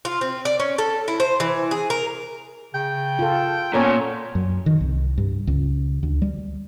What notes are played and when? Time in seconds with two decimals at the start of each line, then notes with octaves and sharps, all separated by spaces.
0.05 F4
0.21 C4
0.45 D5
0.60 C#4
0.78 A4
1.08 E4
1.20 C5
1.40 E3
1.71 G#4
1.90 A#4
2.74 C#3 G5
3.19 F4 A4
3.74 A#2 B3 C#4 A4 C#5
4.35 F#2
4.66 D#3
4.81 C2
5.18 G2
5.47 C#2
6.03 D2
6.22 G3